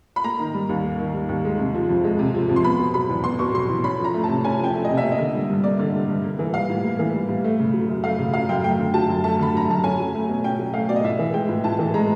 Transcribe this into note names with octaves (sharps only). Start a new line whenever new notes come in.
B5
A#3 A#5
D#3
G3
D#2
A#3
D#3
G3
D#2
G#3
C3
F3
F2
G#3
C3
F3
F2
C6
B3 B5
B2
F#3 B5
E2
B3 C6
B2 C#6
F#3 C6
E2
C#4 B5
F3
A#5
A3
A5
C3
C#4 G#5
F3 G5
A3
C3 D#5
E5
A#3
D#5
D3
G3
G2
A#3 D5
D3
G3
G2
A#3
E3
G3 F5
A2
A#3
E3
G3
A2
A3
C#3
F#3
F#2
A3 F5
C#3
F#3 F5
F#2 G5
A3 G5
D3
F#3 A5
F#2
A3 A5
D3 B5
F#3 A#5
F#2 A5
C#4 G#5
F#3
A3
B2
C#4 G5
F#3
A3 F5
B2 D5
D#5
A2 E5
E3
G#3 G5
A2
A2 A5
E3
G#3 A#5